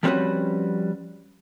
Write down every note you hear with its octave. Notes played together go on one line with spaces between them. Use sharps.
F3 G3 C4 C#4 F#4 B4